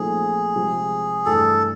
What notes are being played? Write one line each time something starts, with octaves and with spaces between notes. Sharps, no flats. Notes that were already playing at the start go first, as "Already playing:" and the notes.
Already playing: A#2 F3 A3 C4 D#4 G#4
C3 F3 G#3
G2 E3 A3 A4